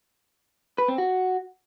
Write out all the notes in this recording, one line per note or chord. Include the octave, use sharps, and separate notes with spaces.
B4
C4
F#4